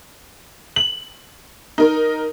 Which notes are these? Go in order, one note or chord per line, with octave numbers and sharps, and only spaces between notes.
F#7
D#4 A#4